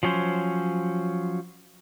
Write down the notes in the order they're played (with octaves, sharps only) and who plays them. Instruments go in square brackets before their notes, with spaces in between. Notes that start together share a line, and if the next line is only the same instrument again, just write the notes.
[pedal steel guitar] F3 F#3 C#4 C5